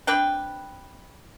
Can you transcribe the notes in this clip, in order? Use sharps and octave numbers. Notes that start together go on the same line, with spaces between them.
C4 D4 B4 G5